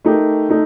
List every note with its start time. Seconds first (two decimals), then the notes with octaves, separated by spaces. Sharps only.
0.05 A3 D#4 G4 A#4
0.49 A3 D#4